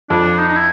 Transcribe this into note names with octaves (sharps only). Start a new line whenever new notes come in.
F2 D4
D#4
D#4
E4